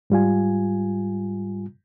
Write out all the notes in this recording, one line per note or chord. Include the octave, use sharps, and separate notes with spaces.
G#2 G3 F4 G#5